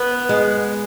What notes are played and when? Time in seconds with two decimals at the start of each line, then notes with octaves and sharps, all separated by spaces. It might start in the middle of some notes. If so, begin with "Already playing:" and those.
Already playing: B3 B4
0.29 G#3